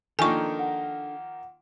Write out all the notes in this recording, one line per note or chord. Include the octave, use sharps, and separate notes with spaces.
D#3 F3 A#3 D4 D#4 A4 G#5 C#6
F#5